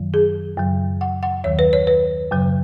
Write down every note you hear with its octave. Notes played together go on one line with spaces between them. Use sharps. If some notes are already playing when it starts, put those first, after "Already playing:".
Already playing: F#2 D#3 F#3
G#4
F#2 C#3 F#3
F#5
F#5
D#2 D#3 F#3 C#5
B4
C#5
B4
F#2 C#3 F#3